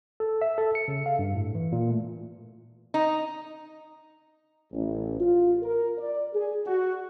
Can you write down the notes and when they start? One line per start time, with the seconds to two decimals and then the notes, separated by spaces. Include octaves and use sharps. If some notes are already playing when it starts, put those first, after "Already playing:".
0.20 A4
0.42 E5
0.58 A4
0.75 C#7
0.88 C#3
1.06 F5
1.19 G2
1.35 A2
1.55 E3
1.72 A#2
1.90 A3
2.94 D#4
4.72 A1
5.19 F4
5.62 A#4
5.98 D5
6.34 G#4
6.65 F#4